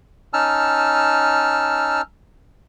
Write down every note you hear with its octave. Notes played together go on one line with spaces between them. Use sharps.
C#4 D#4 A5 E6 F6